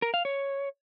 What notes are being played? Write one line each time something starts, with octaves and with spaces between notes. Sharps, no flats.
A#4
F5
C#5